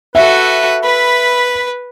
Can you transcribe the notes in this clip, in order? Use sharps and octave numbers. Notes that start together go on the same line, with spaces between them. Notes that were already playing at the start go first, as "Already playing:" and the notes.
F#4 A4 B4 E5
B4 B5